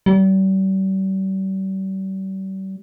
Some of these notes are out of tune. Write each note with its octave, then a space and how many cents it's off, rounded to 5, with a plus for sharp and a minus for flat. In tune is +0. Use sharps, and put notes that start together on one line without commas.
G3 -40